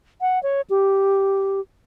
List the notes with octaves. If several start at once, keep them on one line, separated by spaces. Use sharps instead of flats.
F#5
C#5
G4